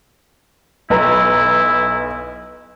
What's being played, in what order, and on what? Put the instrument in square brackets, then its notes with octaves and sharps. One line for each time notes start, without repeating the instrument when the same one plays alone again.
[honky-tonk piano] B1 B4 A#5 [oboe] E4